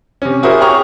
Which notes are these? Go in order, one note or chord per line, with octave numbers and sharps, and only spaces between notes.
C3 C#4
E4 F#4 G#4 A#4 C5 E5
G4 G#4 C#5 A#5 C#6 F6